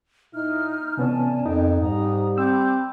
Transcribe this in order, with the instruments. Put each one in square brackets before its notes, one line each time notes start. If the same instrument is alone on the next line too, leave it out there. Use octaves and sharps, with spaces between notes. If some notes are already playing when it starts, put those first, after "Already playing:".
[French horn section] A#2 E4 [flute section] D#4 F6
[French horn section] A2 E3 [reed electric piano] C3 B3 C#4 [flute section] D5 G#5 A5
[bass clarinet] F2 [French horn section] A#3 [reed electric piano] D#4 [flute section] G5
[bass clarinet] G#2 [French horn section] G3 [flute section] A#5 D#6
[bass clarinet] C4 [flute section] B5 D6 G6 [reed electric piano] E6